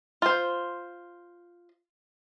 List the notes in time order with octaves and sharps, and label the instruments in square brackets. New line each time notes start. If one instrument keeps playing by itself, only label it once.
[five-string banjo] F4 C5